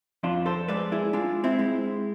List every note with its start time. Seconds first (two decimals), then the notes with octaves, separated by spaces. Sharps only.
0.23 F2 D4 F4
0.46 A4 C5
0.68 G#3 B4 D5
0.92 E4 G#4
1.13 G#3 D4 F4
1.44 C4 E4
1.59 G#3